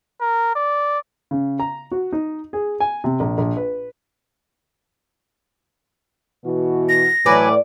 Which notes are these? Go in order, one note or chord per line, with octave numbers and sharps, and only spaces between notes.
A#4
D5
C#3
A#5
F#4
D#4
G#4
G#5
C3
A#1
A#1
B4
B2 E3 F#4
A#6
A2 E3 F#3 B4 D5 G#5